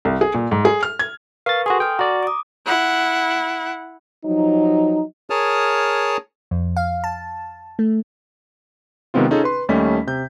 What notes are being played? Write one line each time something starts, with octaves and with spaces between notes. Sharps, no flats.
C2
G#4
A#2
G#2
G#4
F6
G#6
A#4 B4 F5 C#6 A6
F#4 G#4 A4 C6 D#6
G5 G#5 F6
F#4 D5 A#5
D6 D#6
E4 F#5
F3 F#3 D#4
G#4 A#4 C#5 A5 D#6 F6
F2
F5
A5
A3
C3 D#3 G#3 B3 C4 F4
C#4 D#4 F4 G#4 A4
B4 C6
D#2 G3 A3 C#4 D#5 B6
C3 G6